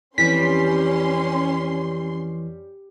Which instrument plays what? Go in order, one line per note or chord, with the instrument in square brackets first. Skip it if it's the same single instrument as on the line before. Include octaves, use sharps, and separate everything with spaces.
[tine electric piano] F2 E3 [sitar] G3 [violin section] C#4 C6 [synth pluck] B6